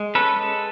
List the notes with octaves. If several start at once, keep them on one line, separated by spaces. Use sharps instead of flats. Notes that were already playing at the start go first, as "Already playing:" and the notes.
Already playing: G#3
C#4 A4 B4
G#3